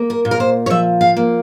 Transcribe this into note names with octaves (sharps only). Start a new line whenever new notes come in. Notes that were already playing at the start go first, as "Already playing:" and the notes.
Already playing: A#3
A#4
A#2
A#4
C5
C#5
F3 E5
F5
A#3